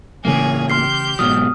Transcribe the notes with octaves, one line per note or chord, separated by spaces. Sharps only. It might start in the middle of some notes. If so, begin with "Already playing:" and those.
A2 C#3 E3 A3 A#3 G#4 C#5
G4 C6 F6 G6 C7
G#2 B2 F#3 D#6 F6